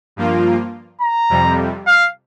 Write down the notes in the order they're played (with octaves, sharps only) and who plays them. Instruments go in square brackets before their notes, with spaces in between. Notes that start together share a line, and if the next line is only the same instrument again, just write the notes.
[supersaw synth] G2 F3 A#3 F4
[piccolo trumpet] A#5
[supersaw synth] F2 C3 G3
[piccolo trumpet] F5